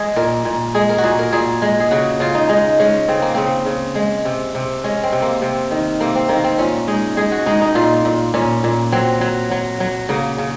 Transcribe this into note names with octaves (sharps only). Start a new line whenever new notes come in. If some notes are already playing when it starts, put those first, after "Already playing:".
Already playing: G#3 G#4
A#2 A#4
A#2
G#3 G#4
A#4
F#4
A#2 G#4
A#4
A#2 G#4
G#3
G#4
C#3 F#4
C#3 F4
D#4
G#3 D#4
G#3 C#4
C#3 C4
A#3
C#3 C4
C#3
G#3
C3
C3
G#3 C#4
C4
C3
A#3
C3 C4
D#3
C3 A#3
C4
D#3 A#3
C4
A#2 C#4
G#3 D#4
G#3 G#4
F#4
G#3 D#4
D#4
A#2 F4
A#2
A#2 C#4
A#2
F#3 C4
F#3
F#3
F#3
C#3 A#3
C#3